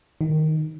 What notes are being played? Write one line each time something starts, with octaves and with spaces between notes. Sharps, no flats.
D#3